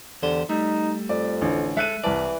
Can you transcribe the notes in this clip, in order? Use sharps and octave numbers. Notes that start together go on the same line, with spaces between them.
E2 D3 G4 C5
G3 A3 D#4
F2 D5
A1 D3
G#3 A4 E5 F#6 D#7
C2 E3 D5 A5